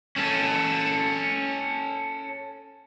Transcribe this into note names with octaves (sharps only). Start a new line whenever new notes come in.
C#4 A4